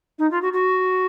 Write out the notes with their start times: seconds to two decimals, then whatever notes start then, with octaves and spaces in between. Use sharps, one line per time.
0.19 D#4
0.31 F4
0.42 F#4
0.53 F#4